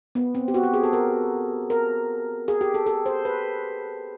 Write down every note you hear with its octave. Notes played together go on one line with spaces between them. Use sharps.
B3
C4
G4
F#4
G4
G#4
A4
A#4
A#4
G#4
G4
A4
A4
C5
B4